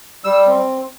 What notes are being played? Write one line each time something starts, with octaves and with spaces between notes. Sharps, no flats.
G3 E6
C4